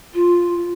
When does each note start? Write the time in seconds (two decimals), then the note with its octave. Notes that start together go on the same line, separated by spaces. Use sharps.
0.14 F4